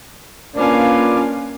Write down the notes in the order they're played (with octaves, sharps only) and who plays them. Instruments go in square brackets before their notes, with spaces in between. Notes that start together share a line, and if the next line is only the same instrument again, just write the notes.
[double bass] A#3 D4 [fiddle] C#4 F5 [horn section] F4 B4 D5